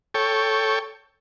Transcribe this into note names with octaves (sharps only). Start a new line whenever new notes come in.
A4 C#5 G5